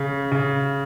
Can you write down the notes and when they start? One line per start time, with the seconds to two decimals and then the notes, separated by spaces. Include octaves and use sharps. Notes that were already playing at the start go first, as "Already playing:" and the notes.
Already playing: C#3
0.32 C#3